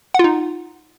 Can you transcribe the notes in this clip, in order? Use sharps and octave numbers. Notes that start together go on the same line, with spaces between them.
D#4 F4 F#5